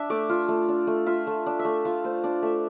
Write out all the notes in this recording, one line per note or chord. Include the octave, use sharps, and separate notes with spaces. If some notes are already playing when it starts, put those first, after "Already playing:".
Already playing: D4 E5
A3 D5
F4
A3
D4
A3
F4 E5
A3
D4
E5
A3
F4 F5
A3 C5
D4 D5
A3 E5